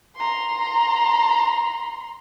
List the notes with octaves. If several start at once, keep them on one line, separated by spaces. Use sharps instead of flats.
A#5 C6